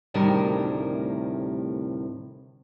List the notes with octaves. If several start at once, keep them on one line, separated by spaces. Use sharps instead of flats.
D2 A2 C3 D#3 G3 A#4